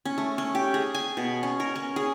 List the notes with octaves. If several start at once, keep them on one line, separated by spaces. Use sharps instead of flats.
C#4
A3
C#4
G4
G#4
G#5
B2
C#4
A#4
C#4
G#4